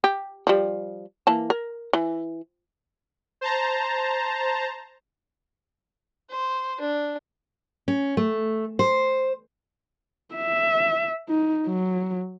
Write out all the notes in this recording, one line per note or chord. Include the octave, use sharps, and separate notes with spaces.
G4
F3 G3
E3 A#3 A5
A#4
E3
C5 A5 A#5
C5
D4
C#4
A3
C5
E5
D#4
F#3